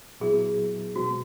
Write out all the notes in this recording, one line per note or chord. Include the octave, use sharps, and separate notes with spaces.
A#2 F#3 B3 E4 G#4
B2 G#3 C4 F#4